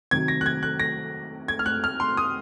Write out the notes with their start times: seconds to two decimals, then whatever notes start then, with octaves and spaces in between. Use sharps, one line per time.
0.11 C3 D#3 F#3 G#6
0.28 A#6
0.41 F#6
0.46 G#6
0.63 F#6
0.79 A#6
1.48 G#6
1.59 F6
1.66 F#6
1.84 F6
2.00 C6
2.17 D#6